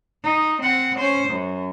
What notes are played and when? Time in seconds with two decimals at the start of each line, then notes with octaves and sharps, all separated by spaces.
0.24 D#4
0.62 C4 F#5
0.98 C#4 C5
1.29 F#2